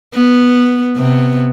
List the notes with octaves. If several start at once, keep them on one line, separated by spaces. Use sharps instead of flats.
B3
C3 B3